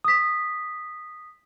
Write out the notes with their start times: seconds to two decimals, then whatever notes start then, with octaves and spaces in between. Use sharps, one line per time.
0.04 D#6 B6